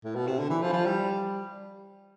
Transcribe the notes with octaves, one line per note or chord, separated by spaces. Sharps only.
A2
B2
C3
D3
E3
F3
E3
F3
G3